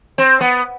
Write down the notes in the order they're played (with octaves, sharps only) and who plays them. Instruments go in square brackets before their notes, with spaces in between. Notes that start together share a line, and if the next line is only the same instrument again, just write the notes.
[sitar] C4
B3